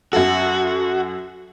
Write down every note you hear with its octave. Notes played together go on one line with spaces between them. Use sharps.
F#2 F#3 F#4 A4